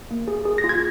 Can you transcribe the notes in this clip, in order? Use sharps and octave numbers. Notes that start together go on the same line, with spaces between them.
A#3
G#4
G#4
A#6
F4
G#6